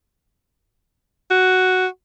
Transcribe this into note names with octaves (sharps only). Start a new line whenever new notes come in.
F#4